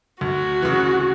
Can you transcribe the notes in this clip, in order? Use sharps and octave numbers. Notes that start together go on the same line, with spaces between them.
D2 F#4
C#3 E3